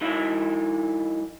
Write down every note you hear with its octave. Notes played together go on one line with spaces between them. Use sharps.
F#3 D#4 E4 E5